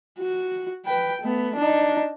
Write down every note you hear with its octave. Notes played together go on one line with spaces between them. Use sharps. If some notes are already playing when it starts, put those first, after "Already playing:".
F#4
B4 G5
A3 B3
D4 D#4